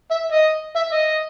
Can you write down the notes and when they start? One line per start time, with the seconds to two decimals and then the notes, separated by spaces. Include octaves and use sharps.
0.11 E5
0.32 D#5
0.76 E5
0.92 D#5